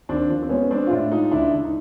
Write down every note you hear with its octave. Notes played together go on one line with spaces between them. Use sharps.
D#2 C4 D4
F3
C4
G#3 B3 C#4
C#4
G#3 C4 D4
F4
A2 D4 E4
G#3 D#4 F4
C#2 D4 E4
C#2
D#4